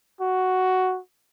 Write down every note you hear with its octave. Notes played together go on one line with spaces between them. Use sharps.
F#4